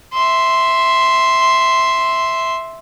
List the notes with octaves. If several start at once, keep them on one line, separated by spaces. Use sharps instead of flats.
E5 C6